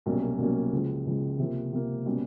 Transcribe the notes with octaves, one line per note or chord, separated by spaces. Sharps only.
C2 B2 F#3 A#3 C#4
C2 B2 F#3 A#3 C#4
C#2 C#3 F3
C#2 C#3 F3
C3 F3 A#3
C3 F3 A#3
B2 G3 A#3 C#4